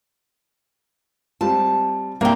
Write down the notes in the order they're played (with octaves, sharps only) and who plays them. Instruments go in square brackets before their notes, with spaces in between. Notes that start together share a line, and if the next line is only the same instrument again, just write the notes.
[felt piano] G3 C4 F4 [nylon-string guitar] A5
[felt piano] C2 A#4 [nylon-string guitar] A#3 C4